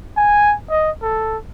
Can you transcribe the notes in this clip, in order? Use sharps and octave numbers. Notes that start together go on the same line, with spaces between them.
G#5
D#5
A4